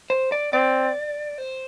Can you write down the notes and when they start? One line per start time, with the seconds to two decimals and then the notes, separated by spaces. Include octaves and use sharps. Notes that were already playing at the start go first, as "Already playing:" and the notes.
0.10 C5
0.32 D5
0.53 C4 D5
1.38 C5